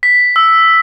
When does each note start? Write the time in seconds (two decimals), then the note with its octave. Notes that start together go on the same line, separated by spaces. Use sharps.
0.03 B6
0.36 E6